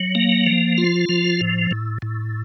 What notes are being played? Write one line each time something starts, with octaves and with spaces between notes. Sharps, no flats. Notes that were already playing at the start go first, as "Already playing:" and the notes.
Already playing: F#3
A#3
F3
F4
F3
A2
A2
A2